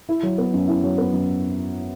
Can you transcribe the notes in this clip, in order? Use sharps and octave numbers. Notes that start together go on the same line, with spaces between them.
E4
F#3
B3
F#2
E4
F#3
B3
F#2